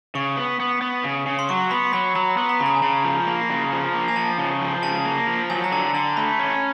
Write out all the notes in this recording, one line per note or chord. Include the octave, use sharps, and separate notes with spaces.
C#3 C#6
B3
B3
B3
C#3
C#3
C6
F#3 C#6
B3 B5
C6
F#3 B5
F#3 A#5
B3
A#5
C#3 B5
A#5
G#5
C#3 A5
F3
A#3
C#3
F3
A#3
G#5
F3 A5
C#3
F3
C#3 A5
A#3
F3
F#3 G#5
A#5
D3 A5
D3 A5
A3 B5
C#4